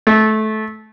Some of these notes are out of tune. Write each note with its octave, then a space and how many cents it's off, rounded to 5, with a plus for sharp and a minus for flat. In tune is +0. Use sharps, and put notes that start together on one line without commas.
A3 -20